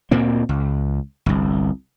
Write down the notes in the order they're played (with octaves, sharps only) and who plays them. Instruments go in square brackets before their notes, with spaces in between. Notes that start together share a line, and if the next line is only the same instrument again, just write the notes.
[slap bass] D2 A#2 A#3 C4
C#2
G1 C2